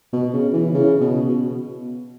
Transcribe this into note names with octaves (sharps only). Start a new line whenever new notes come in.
B2
C#3
E3
C#3
B2
B2